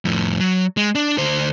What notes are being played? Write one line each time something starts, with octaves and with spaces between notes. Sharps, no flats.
F2 A2
F#3
G#3
D4
D2 C5